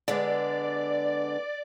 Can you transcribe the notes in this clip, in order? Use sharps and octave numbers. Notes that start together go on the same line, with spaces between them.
D3 G#3 B3 D5